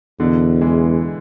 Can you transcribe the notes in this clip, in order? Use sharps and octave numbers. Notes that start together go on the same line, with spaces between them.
E2 B2 D3
E3 G#3